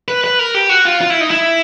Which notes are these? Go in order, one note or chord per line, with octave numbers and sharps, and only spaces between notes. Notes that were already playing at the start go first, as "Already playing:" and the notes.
B4
B4
A#4
G4
F#4
F4
F4
E4
D#4
E4